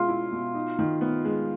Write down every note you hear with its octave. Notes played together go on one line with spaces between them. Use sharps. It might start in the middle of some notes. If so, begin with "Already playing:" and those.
Already playing: B2 G#3 C#4 F4
E4
B2
D#4
D#3
B3
G#3